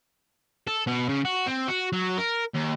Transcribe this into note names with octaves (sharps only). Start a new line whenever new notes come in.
A4
B2
C#3
F#4
C4
F#4
F#3
A#4
D#2